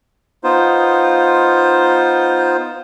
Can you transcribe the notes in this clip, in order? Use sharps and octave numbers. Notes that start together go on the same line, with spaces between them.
B3 D#4 F4 C5